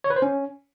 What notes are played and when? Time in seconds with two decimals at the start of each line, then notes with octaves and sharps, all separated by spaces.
0.04 C#5
0.10 B4
0.16 C5
0.22 C#4